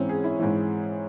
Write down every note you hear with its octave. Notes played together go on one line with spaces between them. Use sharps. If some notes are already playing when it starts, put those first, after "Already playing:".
Already playing: G#2 E3 C4 C#4
G#4
E4
G#2 E3